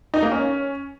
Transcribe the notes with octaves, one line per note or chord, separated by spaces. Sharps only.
D#4
A#3
C#4